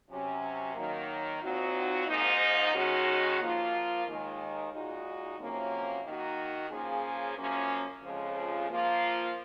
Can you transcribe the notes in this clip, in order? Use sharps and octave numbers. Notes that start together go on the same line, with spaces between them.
C3 F#3 C#4
D#3 F#3 A#3
A#2 F#3 C4 D#4 F#4
G#2 F3 A#3 D#4
D#3 G#3 C#4 F#4
F3 A#3 F4
D#2 D#3 G#3
A#2 G#3 D#4 F#4
F2 C3 F#3 A#3 C#4
D#3 A#3 D#4 F#4
C#3 F3 A#3 C#4 G#4
F#2 F3 A#3 C#4
F2 C#3 F3 G#3
F3 A#3 F4